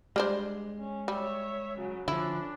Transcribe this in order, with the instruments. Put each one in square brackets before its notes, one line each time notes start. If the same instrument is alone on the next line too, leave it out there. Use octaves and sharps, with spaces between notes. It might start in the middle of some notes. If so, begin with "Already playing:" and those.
[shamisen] G3 D4 C5 [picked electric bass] G#3
[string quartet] C#4
[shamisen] G3 [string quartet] C#5 E5
[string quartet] C#3 F#3
[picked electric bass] D3 F3 [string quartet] C#4 D4 [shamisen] E4